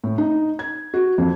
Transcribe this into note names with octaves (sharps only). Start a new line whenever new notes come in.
A2
D#4
G#6
F#4
F2